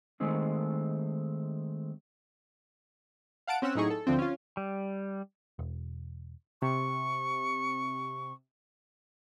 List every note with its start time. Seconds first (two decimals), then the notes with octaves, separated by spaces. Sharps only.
0.20 D#3 G#3 A3 C4 D#4
3.47 F5 F#5 A5 D7
3.62 C4 C#4 F#5 E6 F#6
3.75 A2 F#3 D#4 E4 G#4 C#6
3.90 A4
4.07 D2 D3 F3 C4
4.18 C#4 F4
4.57 G3
5.59 E1
6.62 C3 C#6